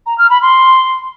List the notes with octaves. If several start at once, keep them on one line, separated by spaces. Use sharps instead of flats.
A#5
F6
B5
C6